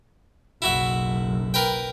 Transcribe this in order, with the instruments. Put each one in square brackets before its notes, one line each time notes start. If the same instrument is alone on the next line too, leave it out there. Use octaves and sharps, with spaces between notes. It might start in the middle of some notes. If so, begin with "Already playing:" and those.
[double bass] F#1 B1 [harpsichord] E4 F#4 E5
[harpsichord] A#4 B4 G5